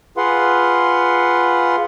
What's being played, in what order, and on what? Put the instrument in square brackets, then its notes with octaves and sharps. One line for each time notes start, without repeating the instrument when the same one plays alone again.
[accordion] F4 G#4 B4 F5 F#5 C6